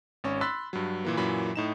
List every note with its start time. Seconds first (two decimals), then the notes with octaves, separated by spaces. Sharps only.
0.24 G#1 C#4 C#5
0.41 B5 C6 E6 F#6 A6 B6
0.73 G2 F#3
1.05 A#2 E3 A#3
1.17 F#2 A#2 E3 F#3 B5
1.56 A2 D#4 E7